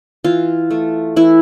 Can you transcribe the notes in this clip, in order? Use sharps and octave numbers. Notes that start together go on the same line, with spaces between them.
E3 F4
A3
E3 E4